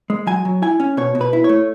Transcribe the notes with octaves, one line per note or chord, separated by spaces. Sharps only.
G#3
F#3 G#5
F#3
E4 G#5
C#4
B2 C#5
B2
B4
E4
C#5
A3